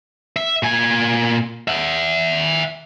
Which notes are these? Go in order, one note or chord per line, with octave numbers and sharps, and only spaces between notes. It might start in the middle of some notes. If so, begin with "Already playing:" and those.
E5
A#2 G#5
E5 F#5